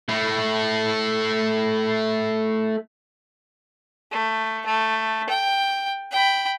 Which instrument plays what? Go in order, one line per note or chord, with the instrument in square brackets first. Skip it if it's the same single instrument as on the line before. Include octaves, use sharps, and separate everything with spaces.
[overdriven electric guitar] A3 E4
[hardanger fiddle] A3
A3
G5
G5 B5